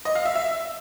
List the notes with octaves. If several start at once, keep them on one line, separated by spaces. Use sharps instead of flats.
D#5
F5
E5
E5